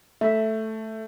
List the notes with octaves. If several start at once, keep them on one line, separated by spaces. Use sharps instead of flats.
A3 E5